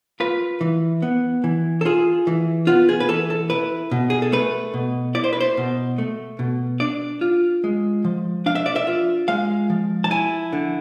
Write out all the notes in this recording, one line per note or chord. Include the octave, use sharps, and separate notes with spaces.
F4 B4
E3
B3
E3
A4
F4 G#4
E3
B3 F4
G#4
B4
E3 A4
A4
E4 B4
B2
G#4
A4
A3 B4
B2
E4 D5
C5
B4
C5
B2
A3
B2
D4 D5
F4
G#3
F3
D4 F5
E5
D5
E5
F4
G#3 F5
F3
A5
E4 G#5
D3